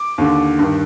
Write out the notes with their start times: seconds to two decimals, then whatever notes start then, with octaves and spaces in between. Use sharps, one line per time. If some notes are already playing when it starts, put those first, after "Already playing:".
Already playing: D6
0.18 D#2 D3
0.59 G2 D#3